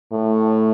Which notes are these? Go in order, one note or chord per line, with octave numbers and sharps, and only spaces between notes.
A2